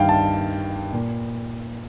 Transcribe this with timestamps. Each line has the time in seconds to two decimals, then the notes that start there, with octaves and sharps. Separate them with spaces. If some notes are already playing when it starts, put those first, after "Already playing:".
Already playing: G2 D#3 F5 G5
0.09 A5
0.93 A#2